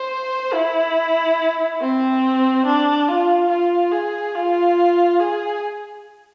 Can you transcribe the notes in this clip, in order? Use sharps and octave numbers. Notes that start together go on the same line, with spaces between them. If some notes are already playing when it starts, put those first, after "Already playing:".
Already playing: C5
E4
C4
D4
F4
F4
G#4
F4
G#4